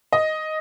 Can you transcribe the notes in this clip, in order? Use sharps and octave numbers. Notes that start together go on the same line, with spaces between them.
D#5